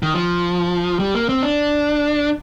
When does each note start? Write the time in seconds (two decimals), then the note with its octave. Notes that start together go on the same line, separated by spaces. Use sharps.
0.03 D#3
0.14 F3
1.00 G3
1.15 A#3
1.29 C4
1.43 D4